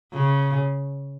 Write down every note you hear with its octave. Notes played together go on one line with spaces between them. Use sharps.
C#3